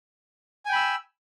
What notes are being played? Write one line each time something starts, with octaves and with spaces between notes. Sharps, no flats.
G5 G#5 B5 E6